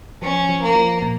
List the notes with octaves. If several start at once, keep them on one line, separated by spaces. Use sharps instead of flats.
F3 C#4
F3
A#3
F3
A#2